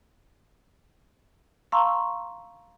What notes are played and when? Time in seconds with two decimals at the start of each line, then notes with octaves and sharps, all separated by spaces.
1.72 F5 A5 A#5 C6 C#6 E6